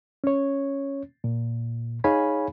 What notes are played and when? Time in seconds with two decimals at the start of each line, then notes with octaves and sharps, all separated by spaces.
0.24 C#4 C#5
1.24 A#2
2.04 D#4 G#4 C#5 F5 G#5 B5